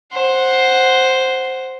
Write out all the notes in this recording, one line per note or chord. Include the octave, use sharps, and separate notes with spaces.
C5 F#5